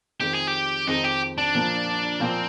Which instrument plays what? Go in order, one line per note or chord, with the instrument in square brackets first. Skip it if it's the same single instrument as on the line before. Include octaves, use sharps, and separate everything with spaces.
[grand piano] F2 D#3 G#3 C4 [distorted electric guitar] G4
[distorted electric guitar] G#4
G4
[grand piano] F2 D#3 G#3 C4 [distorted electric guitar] D#4
[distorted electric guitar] G4
D4
[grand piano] A#2 F3 A#3
[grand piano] A#2 F3 A#3 [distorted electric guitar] C4